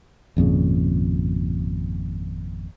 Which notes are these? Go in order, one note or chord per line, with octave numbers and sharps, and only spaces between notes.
G#1 F2 A#2 C#3